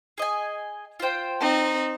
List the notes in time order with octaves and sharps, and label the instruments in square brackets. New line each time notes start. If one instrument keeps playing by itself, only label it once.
[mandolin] G#4 D#5 G#5
F4 C5 G5
[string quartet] C4 D#4